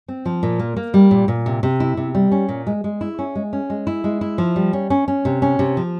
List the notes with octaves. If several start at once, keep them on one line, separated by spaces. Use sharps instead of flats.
C4
F3
A#2
A#3
A#3
G3
A#2
A#2
C3
C3
E4
C3
G3
C#4
A#2
G#3
G#3
E4
C#4
G#3
C#4
G#3
E4
G#3
E4
F3
G3
C#4
C#4
C#4
C3
C#4
C3
F3